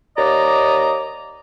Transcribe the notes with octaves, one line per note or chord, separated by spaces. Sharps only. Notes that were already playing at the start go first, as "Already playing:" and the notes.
D#2 D5 D#5 A#5 D6